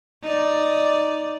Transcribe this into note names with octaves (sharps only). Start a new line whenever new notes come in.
D#4 D5